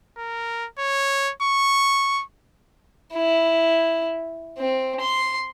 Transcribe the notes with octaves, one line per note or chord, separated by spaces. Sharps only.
A#4
C#5
C#6
E4
C4
C6